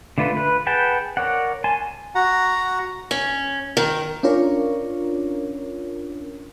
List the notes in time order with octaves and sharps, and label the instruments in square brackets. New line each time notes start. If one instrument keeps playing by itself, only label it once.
[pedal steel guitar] D3 A3 F4 B4
B4
G#4 B4 F#5 G5 A5
A#4 C#5 D5 F#5
G#5 A5 C6
[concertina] F#4 F#5 A#5
[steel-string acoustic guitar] C#4
D#3
[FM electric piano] C#4 D4 F4 A#4 C#5